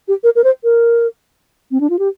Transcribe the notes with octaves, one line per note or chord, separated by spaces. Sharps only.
G4
A#4
A#4
C5
A#4
C4
D4
F4
G4